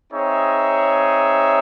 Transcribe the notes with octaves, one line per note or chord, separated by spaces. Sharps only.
C4 D#4 G#4 C#5 E5